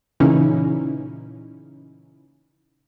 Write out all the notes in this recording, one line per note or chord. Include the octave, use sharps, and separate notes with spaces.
A#2 C#3 E3 C#4 D#4 E4